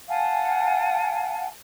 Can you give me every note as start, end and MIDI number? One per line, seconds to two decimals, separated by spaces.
0.09 1.48 77
0.09 1.48 78
0.09 1.48 80
0.09 1.48 81